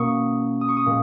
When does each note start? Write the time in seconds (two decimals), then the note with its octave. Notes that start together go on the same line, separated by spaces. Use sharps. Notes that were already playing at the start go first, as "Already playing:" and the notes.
Already playing: B2 A#3 C#4 C#6 D#6
0.61 D#6
0.69 C#6
0.77 D#6
0.86 A#2 G#3